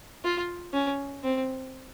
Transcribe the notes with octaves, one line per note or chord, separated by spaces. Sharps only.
F4
C#4
C4